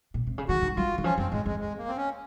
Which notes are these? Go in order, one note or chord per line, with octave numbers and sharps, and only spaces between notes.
A#2
C3
C#3
D#3 F#4
D#3
F#3 F4
D#3
F3 C#4
F#2 C4
G#2 G#3
F2 G#3
G#3
A#3
C4
C#4